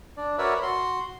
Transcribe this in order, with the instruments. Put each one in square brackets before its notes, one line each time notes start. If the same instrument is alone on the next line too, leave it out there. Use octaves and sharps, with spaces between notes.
[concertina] D4 D5
F#4 A#4 B4 C#5 D5 E5
F#4 C6